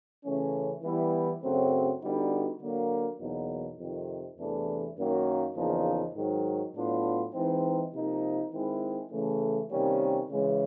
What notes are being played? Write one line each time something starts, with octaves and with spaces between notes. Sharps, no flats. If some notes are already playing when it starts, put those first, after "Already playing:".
C#3 E3 A3 C#4
E3 G3 B3 E4
F#2 C#3 F#3 A3 C4
D3 G3 B3 D#4 F#4
D3 F#3 A#3
E2 B2 F#3 A#3 D#4
F2 C3 D#3
E2 C3 E3 A3 D4
F#2 D#3 F#3 A#3
E2 C#3 F3 A#3 D#4
G#2 D#3 F#3
A2 F#3 B3 D4 F4
E3 G#3 C4 D#4
C3 F3 A#3 D#4
D#3 G#3 C4 E4
C#3 E3 A3
C3 D#3 G3 A#3 C#4
C#3 E3 G#3 C#4